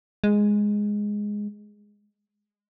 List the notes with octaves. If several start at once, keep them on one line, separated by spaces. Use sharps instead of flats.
G#3